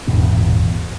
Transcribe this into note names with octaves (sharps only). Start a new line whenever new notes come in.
D#1 G#1 E2 B2